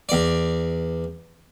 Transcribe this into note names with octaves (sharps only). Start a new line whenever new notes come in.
E2 D5